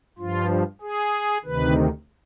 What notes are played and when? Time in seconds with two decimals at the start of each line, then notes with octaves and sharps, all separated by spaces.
0.19 G2 F3 F4
0.81 G#4
1.45 D2 C3 D#3 B4